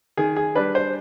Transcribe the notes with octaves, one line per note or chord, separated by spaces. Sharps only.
D#3 G#4
G#4
G3 D4 B4
C5